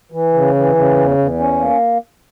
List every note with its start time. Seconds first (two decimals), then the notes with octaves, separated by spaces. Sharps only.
0.12 E3
0.34 C#3
0.55 E3
0.75 C#3
0.97 E2
1.18 E2
1.39 C#4
1.60 A#3